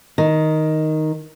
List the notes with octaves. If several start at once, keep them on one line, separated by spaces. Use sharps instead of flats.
D#3